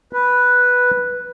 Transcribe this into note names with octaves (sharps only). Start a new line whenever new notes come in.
B4